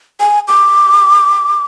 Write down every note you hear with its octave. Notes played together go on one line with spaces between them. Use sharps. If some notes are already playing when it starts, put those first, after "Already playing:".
G#5
D6